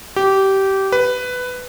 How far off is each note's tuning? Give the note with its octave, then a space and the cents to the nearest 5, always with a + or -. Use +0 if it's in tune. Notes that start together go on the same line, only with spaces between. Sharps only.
G4 -20
B4 +10